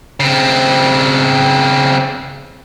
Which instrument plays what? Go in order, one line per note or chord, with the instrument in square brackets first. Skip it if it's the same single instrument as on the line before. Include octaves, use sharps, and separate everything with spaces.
[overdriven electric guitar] C#3 C4